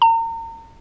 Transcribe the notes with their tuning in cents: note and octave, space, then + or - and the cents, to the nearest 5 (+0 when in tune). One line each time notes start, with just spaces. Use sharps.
A#5 -35